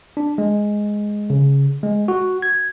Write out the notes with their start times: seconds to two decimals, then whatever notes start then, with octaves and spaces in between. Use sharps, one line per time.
0.17 D4
0.38 G#3
1.30 C#3
1.83 G#3
2.08 F#4
2.42 G#6